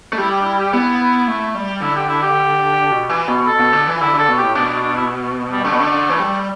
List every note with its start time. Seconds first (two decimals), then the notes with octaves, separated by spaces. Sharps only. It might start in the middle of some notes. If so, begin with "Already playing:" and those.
0.13 A3
0.18 G3 E4
0.31 G4
0.41 D4
0.45 E4
0.58 G4
0.73 B3 E4
1.28 A3
1.55 G3
1.81 D3 E4
1.96 G4
2.09 E4
2.23 G4
2.91 B2
3.09 E3
3.28 B2
3.46 A4
3.60 B2
3.73 D3
3.87 E3
4.01 D3 E4
4.14 D3 A4
4.28 B2
4.38 A2 G4
4.55 B2 D4
4.69 D4
4.82 D4
4.96 E4
5.51 G3
5.64 D3 A3
5.72 B2
5.80 D3
6.09 E3
6.19 G3